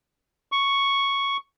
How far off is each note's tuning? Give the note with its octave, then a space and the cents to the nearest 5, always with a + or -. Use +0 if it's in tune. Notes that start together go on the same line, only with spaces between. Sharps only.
C#6 +0